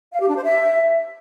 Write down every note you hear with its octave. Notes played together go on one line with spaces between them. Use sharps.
F5
G4
D4
C5
E5